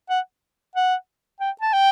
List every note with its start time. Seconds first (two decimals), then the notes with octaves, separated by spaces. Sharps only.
0.10 F#5
0.76 F#5
1.41 G5
1.61 A5
1.73 G5